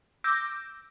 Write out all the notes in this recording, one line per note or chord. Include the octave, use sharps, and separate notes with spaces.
D6 E6 G6 A#6